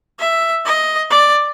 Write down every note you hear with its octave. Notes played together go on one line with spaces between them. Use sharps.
E5
D#5
D5